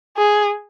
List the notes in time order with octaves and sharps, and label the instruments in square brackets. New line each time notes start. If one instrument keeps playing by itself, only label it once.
[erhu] G#4